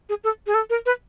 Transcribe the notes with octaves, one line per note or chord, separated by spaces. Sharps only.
G#4
A4
G#4
A4
A#4
B4